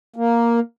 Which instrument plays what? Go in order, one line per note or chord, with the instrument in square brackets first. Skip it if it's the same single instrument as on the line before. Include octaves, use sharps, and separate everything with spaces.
[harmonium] A#3